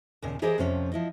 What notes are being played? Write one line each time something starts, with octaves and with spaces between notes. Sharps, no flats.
D#2 A#2 C#3
E3 G4 G#4 A#4 C5 D#5
F2 C3 F3 C#4
F3 E4 D#5